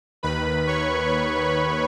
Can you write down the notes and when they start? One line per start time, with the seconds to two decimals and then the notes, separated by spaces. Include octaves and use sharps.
0.23 D#2 D#3 B4 B5
0.67 C#5 C#6